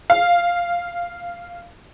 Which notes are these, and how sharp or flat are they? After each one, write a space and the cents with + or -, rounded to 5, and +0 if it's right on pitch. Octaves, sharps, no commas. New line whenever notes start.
F5 -5